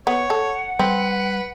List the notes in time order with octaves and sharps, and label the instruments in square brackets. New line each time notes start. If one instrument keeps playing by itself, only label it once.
[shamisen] B3 [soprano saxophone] C#5 [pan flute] F#5
[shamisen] A4
[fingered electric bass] G3 [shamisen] C4 [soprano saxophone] B4